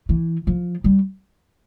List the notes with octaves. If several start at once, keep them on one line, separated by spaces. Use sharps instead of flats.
E3
F3
G3